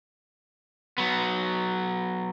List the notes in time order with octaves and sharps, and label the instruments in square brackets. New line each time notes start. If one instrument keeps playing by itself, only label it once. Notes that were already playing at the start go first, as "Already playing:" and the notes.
[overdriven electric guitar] F#3 B3